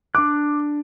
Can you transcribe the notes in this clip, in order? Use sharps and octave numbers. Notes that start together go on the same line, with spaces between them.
D4 D6 F#6